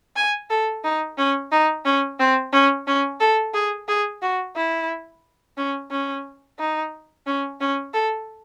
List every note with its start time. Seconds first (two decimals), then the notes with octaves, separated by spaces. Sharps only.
0.16 G#5
0.50 A4
0.84 D#4
1.18 C#4
1.52 D#4
1.85 C#4
2.19 C4
2.53 C#4
2.87 C#4
3.20 A4
3.54 G#4
3.88 G#4
4.22 F#4
4.56 E4
5.57 C#4
5.91 C#4
6.59 D#4
7.26 C#4
7.60 C#4
7.94 A4